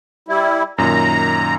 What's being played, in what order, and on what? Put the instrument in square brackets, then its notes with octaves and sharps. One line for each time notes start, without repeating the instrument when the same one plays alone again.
[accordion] G3 E4
[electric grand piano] F#2 A#2 D#3 [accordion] A#5